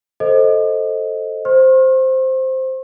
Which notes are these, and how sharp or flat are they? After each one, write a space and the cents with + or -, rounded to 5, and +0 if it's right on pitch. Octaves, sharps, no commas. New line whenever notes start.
A4 +0 C5 +10 D#5 +10
C5 +0 C6 +45